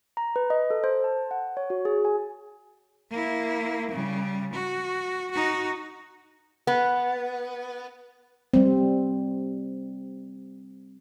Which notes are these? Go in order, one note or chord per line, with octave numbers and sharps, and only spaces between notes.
A#5
B4
D#5
A4
C5
A5
F#5
C#5
F#4
G#4
G#5
A#3 E4
C#3 G3
F#4
D#4 F#4
B3
G3 C4